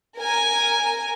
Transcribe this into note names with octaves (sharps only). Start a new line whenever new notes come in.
A#4 G#5